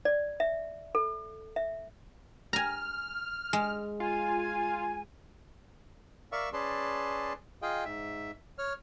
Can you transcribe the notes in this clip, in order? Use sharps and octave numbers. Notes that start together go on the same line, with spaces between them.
D5
E5
A4
E5
G#5 A#5 F6
G#3
F4 G#5
A#4 D5 E5 F5 C#6 E6
C#4 G#4 B4 D5 A5 C6
F4 G#4 D#5 F5 G5
G#2 E5
C#5 F6